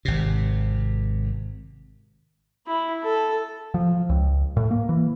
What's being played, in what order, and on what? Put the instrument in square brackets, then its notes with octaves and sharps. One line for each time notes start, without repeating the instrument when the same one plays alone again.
[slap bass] G#1 C3
[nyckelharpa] E4
A4
[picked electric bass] F3
C#2
A2
A#3
E3